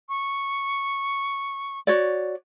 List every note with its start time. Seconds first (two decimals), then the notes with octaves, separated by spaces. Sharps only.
0.09 C#6
1.87 F#4 C#5 D5